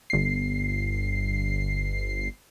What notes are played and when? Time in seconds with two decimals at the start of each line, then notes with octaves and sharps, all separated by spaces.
0.10 G1 C7